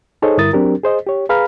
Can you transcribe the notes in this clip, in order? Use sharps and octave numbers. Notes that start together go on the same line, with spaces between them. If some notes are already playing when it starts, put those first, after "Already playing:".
D#4 G#4 A4 C5 C#5 D#5
G2 D3 E4 A#4 D#6 A6
F#3 C4 D4 G4 A#4
G#4 C5 D#5
G4 C#5
G#4 B4 F5 A#5 B5 F6